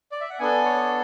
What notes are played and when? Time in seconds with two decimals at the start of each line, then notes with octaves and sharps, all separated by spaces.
0.12 D5
0.21 E5
0.30 F#5
0.39 B3 D4 A4 G#5
0.65 C#5